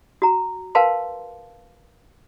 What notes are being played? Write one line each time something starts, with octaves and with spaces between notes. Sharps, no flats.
F#4 A#5
A#4 B4 F5 G5 A5 C6